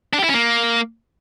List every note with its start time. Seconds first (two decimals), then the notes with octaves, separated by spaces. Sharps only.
0.13 D4
0.18 G4
0.24 E4
0.29 C#4
0.34 A#3